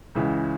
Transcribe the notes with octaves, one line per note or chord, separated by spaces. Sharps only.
C#2 C#3 E3